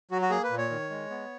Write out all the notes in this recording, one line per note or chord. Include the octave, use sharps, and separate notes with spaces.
F#3 F#4
F#4
A#3 G#4
B4
A#2
C#5
D#3
G#3
B3